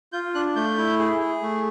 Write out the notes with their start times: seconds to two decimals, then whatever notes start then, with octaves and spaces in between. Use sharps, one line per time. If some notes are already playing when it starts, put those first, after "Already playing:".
0.13 F4 G6
0.35 D4 F#6
0.56 A3 G6
0.78 E4
0.99 G#4
1.20 G#4
1.42 A3